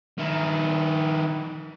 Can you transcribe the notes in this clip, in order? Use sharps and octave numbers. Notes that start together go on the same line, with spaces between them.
D#3 E4